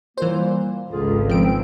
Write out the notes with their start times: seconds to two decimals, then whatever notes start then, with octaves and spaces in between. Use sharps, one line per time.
0.18 A#2 E3 G3 A#3 C5
0.91 G#1 C#2 D3 F4 G#4
1.30 F3 C4 D7